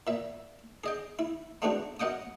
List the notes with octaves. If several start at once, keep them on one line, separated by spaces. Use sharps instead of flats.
A#2 E5
G#4 D#5 G5
E4
G#3 A3 B3 C4 D4 F#4
F#2 D#5 F#5 G5 D#6